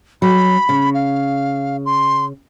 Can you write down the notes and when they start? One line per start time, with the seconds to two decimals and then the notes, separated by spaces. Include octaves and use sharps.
0.22 F#3 B5
0.69 C#3
0.94 F5
1.86 C6